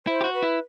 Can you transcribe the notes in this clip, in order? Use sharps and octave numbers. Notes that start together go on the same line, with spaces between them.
E4 C5
G4
F#4
B4
E4